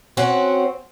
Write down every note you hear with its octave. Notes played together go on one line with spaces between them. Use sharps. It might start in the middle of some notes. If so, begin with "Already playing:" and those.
C4 C#4 F#4